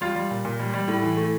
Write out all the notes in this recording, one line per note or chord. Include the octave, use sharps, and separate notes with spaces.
G3 F4
G3
A#2
A#2
G3
G3
A2
E3
A3